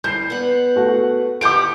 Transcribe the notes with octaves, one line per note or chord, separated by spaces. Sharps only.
G3 G6 C7
B3 F#5
A3 F#4
G4 F#5 D6 G6 D7